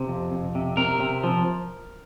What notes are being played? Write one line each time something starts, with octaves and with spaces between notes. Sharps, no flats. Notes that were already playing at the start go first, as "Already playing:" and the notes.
Already playing: C3
F2
F2
C3
C3 A#4
C3
F3